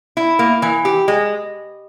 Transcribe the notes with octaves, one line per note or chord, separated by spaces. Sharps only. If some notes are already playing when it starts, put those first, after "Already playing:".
E4
A#3
E3
G4
G#3